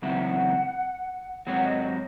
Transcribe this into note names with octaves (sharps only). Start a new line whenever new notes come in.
E2 C#3 F#3 C4 E4 F#5
G#2 F#3 C4 F#4 C#5 F#5
D#5
D#5